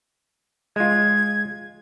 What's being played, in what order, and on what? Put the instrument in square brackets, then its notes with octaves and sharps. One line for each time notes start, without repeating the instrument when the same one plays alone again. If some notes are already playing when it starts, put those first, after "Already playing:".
[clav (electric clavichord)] G#3 F4 [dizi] G#6